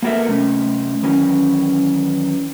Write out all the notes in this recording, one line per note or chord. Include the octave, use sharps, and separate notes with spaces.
A#3 B3 F#4 A4 A#4 E5
C3 A3 C#4
D#3 E3 F#3 C#4